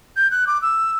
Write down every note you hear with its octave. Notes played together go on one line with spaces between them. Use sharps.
G6
F#6
D6
E6